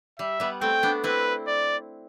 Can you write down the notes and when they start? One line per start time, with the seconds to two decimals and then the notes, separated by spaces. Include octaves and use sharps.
0.19 G3 E5
0.40 G3 B3
0.61 A3 C4 G5
0.83 B3 D4
1.04 C4 E4 B4
1.47 D5